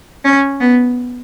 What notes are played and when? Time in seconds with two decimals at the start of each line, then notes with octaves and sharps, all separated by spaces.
0.25 C#4
0.60 B3